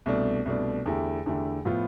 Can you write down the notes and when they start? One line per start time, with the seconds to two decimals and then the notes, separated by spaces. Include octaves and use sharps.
0.06 C2 B2 A3 D4
0.46 C2 B2 A3 D4
0.86 E2 D3 A3 E4 G4
1.26 E2 D3 A3 E4 G4
1.65 A2 F3 B3 F4